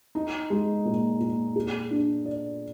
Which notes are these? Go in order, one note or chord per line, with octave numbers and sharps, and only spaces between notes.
D#4
G#3
A#2
A#2
G#4
D4
D5